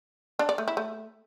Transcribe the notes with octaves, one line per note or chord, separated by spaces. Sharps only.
D4
D5
A3
E4
A3